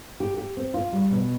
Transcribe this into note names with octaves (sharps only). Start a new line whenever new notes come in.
G4
G4
C4
F4
G3
B2